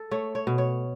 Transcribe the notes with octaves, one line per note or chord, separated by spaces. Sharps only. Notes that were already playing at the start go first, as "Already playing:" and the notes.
Already playing: A4
A3 C#5
C#5
B2
C#5